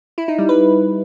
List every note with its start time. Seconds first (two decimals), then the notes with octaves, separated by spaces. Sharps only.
0.18 E4
0.28 D#4
0.38 G3
0.49 B4